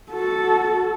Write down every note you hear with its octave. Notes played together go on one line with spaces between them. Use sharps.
F#4 A4